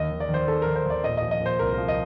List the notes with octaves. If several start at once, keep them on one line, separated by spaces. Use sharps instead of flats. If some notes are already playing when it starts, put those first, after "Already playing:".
Already playing: D#2 D#5
D#3
D5
D#3
C5
D#3 A4
D#3 A#4
C5
D#2 D5
A#2 D#5
D#5
F3
D#5
A#2
C5
C2 A#4
F3 A#4
D#5